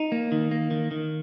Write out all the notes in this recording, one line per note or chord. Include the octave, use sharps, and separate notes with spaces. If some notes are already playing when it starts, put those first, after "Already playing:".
Already playing: D#4
A#3
D#3
A#3
D#3
D#3